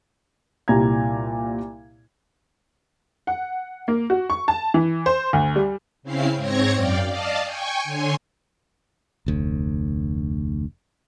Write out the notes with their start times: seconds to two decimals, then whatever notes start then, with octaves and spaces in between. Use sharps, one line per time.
0.68 C2 A#2 G3 A#5 G#6
3.27 F#5
3.88 A#3
4.10 F#4
4.30 C#6
4.48 A5
4.74 E3
5.06 C5
5.33 D2
5.56 G3
6.03 C#3 C4 C#4 E4 F5 C7
6.36 G#2 C4 C#5 G#6 A#6 C#7
6.74 F#2 D5 F5 G5
7.07 D5 D#5 F5 A5
7.42 G5 G#5 C#6
7.84 D3 C#5 G#5 C6
9.26 F1 D2